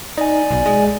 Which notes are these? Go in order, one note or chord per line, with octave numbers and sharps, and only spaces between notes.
D#4 D5 G#5
B1
G#3